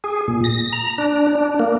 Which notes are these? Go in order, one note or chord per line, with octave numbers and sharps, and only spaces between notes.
G#4
A#2
A#6
A#5
D4
D4
A#3